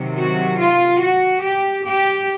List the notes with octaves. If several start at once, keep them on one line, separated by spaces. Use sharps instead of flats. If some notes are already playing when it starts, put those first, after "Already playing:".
Already playing: C3 D#3 F#3
F#4
F4
F#4
G4
G4